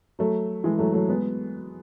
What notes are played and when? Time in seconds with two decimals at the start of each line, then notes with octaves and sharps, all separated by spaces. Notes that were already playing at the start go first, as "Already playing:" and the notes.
0.19 F#3 A3
0.64 E3 G#3
0.79 F#3 A3
0.93 F#3 A3
1.08 G#3 B3